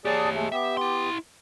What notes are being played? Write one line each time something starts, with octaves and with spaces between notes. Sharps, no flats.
G4 G#4 C#5 D5 A5
G#3 A3
B3 G4 E5
E4 C6